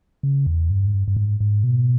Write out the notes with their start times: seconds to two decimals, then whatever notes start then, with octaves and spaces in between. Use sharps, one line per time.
0.23 C#3
0.47 E2
0.70 G2
0.87 G#2
0.94 G2
1.08 G2
1.17 G#2
1.40 G#2
1.64 B2